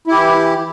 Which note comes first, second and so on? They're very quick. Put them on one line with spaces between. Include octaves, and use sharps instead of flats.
E4 G4 E3